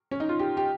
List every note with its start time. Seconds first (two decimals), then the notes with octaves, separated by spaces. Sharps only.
0.11 C#4
0.20 D#4
0.29 F4
0.39 G4
0.57 G4